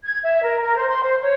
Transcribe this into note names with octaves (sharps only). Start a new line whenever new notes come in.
G#6
E5
A#4
A#4
C5
C6
C5
C#5